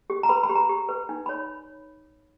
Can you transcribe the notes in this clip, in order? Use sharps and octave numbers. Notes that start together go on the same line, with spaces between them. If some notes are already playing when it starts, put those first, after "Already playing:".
G4
A#5
B4 B5
B5
G4
A#5
G4
B4
D#4
B5
C#5